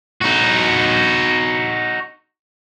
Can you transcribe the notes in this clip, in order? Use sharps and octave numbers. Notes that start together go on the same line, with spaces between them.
D#4 F#4